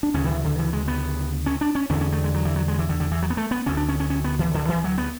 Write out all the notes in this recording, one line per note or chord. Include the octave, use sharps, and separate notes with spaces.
D4
D2 C#3 C#4
D3
E3
D3
E3
G#3
B3
C#4
D4
C#4
E2 D3 C#4
C#4
A3
G#3
F#3
E3
F#3
G#3
E3
D3
D3
E3
F#3
B3
A3
B3
D2 D3 C#4
D4
C#4
C#4
C#4
B3
E3
D3
E3
F#3
B3